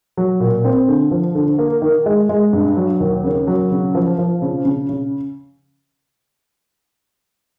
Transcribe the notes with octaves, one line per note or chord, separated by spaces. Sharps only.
F#3
A#2
C4
D3
F3
D3
A#3
D#3
G#3
G#3
G2
F#3
D#2
C#3
F#3
C#3
F3
F3
C#3
C#3
C#3